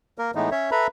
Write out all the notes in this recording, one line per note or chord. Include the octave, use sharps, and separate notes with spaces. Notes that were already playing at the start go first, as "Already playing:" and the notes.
A#3 A#4
A2 E3 G#3 A3 B3 D#4
C#4 C#5 E5
A4 B4 E5 A#5 B5